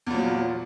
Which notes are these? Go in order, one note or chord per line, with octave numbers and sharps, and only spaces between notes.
E2 A#2 F3 F#3